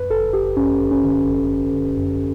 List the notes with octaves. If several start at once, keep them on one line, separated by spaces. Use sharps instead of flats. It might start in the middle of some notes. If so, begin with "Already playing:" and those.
Already playing: F#2 B4
G1 A4
G1 G4
F#2 C#4
G1
C#4
D3
G1
G1
D3
F#2